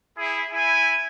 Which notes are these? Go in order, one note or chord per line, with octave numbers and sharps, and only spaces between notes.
E4 G#4
E4 G#5